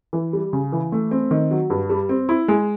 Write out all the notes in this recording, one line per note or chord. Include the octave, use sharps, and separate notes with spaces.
E3
G3
C#3
E3
A3
C4
D#3
F#3
G2
G3
C4
E4
G#3